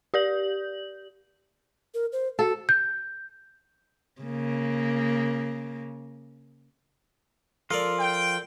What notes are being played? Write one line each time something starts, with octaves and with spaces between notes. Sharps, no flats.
G4 D5 G6 F#7
A#4
C5
F#4 A4
G6
C#3 A#3
F3 F4 A4 A#4 D5
G5